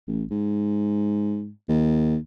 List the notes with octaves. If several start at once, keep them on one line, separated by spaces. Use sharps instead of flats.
A1
G#2
D#2